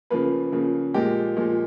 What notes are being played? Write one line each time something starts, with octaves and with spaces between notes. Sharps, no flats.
C#3 F3 A#3 B4
C#3 F3 A#3
A#2 F3 G#3 G4
A#2 F3 G#3